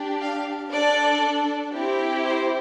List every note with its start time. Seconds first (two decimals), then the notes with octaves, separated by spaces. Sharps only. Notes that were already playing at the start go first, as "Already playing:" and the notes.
Already playing: D4 G4
0.21 F5
0.72 D4 A4 D5
1.74 C4 E4 G4
2.25 C5